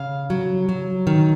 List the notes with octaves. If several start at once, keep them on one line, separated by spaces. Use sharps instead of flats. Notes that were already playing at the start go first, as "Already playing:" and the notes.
Already playing: C#3 F5
F#3
F#3
D#3